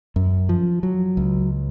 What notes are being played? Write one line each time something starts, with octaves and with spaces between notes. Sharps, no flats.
F#2
F3
F#3
C#2